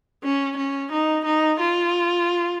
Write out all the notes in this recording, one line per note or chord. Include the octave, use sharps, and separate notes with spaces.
C#4
C#4
D#4
D#4
F4